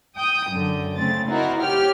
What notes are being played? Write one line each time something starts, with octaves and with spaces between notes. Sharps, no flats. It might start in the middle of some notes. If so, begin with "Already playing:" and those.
G5 D#6 G6
F#2 D3
C#3 A3 C4 A6
C4 D#4 E4 F#4 A#4
G4 C#5 G5 F6